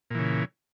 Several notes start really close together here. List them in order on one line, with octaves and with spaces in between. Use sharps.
A#2 E3 C#3